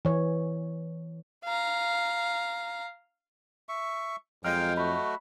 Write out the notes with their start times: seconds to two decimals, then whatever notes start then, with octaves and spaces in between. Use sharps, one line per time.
0.05 E3 C#5
1.45 F5 A#5
3.69 E5 C#6
4.44 F2 F#3 G#3 D#5 F5 G5 F6 G6
4.77 A3 F#4 B5